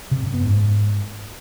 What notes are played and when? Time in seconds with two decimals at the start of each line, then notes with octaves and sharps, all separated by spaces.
0.11 C3
0.23 F#2
0.34 B3
0.45 G#2